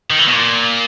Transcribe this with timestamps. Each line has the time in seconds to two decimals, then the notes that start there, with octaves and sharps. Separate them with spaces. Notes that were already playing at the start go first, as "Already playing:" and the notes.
0.10 D#3
0.19 E3
0.27 B2
0.35 A#2